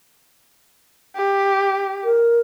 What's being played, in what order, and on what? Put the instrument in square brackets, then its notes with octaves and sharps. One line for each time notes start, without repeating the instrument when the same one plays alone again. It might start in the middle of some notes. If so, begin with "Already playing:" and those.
[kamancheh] G4
[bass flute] A#4